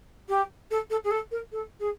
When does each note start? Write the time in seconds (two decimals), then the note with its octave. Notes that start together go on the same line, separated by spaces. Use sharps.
0.28 G4
0.71 A4
0.90 A4
1.04 G#4
1.11 A4
1.31 A#4
1.52 A4
1.80 G#4